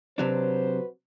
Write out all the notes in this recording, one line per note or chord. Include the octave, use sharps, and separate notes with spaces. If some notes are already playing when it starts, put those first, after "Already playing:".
C3 F#3 D4 F#4 B4 C5